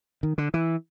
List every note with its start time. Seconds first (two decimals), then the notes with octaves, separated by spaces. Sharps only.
0.23 D#3
0.38 D3
0.54 E3